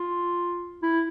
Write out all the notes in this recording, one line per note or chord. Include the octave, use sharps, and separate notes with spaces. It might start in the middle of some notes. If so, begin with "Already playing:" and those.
Already playing: F4
E4